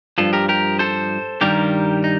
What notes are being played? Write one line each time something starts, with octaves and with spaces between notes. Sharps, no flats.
G2 F3 F4 A4
G4 A#4
G4 A#4
A4 C5
G2 D#3 G3 G4 A#4
D#4